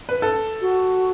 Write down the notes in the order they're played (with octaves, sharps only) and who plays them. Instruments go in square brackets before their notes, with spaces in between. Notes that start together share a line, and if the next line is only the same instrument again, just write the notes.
[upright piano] B4
A4
[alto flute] F#4